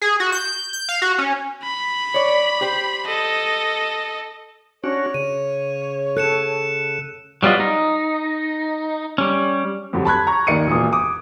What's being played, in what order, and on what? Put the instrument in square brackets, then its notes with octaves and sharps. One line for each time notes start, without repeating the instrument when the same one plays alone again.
[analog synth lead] G#4
F#4
G6
G6
F5
F#4
C#4
[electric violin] B5
[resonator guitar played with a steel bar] C#5 D5
G4 C5
[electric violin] A4 D#5
[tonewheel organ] C#4 D4 F#4 [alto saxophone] C#5
[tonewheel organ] C#3 [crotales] D#7
[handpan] A4 [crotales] F#6 C#7 E7
[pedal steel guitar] F#3 G3 B3 F4 D#5
D#4
G3 C#4
[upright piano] F2 D3 F#3 G3
A5 B5 F#6 G#6
A#5 C#6 G#6
D#2 D#3 D5 C#7 D#7
E1 A#2 D#6
D6 D#6